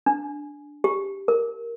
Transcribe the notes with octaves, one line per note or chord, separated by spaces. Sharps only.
D4
G4
A#4